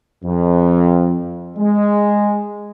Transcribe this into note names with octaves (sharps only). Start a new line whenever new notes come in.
F2
G#3